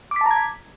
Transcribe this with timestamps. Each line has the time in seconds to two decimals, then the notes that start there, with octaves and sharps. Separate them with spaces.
0.11 D6
0.16 B6
0.21 A5
0.26 A#5
0.31 G#6